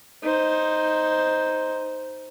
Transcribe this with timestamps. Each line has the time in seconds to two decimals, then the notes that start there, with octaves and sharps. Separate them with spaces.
0.23 D#4 C5